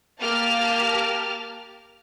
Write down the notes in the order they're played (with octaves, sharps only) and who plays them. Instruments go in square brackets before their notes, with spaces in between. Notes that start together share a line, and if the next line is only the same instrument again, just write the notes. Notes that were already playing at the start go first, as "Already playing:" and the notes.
[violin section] A#3 G4 A5 D6 F6 A6